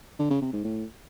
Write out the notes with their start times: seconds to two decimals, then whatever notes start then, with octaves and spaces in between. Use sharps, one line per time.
0.19 D3
0.31 C#3
0.42 C3
0.53 G#2
0.64 A2